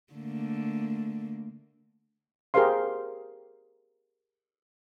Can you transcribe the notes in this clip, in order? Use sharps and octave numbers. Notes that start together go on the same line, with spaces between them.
D3 A3 A#3
G4 G#4 A#4 C5 F5 C6